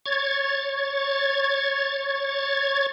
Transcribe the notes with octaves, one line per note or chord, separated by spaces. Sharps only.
C#5 G#6 A6